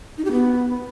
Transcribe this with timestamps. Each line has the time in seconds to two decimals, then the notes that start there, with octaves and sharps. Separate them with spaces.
0.18 D#4
0.25 G4
0.32 B3